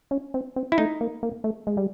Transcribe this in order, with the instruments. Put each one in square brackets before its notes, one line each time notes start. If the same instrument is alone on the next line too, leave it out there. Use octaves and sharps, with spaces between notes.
[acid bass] C#4
C4
C4
[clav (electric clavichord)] E4
[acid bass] A3 [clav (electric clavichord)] D#4
[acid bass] A#3
A#3
A3
G#3
G3